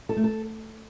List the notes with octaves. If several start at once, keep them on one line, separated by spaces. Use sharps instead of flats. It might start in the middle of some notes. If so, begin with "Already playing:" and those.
A4
A3
A4